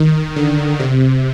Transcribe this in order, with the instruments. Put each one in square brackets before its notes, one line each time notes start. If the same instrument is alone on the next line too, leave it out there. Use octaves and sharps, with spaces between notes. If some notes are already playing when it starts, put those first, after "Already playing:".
Already playing: [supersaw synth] D#3
D3
C3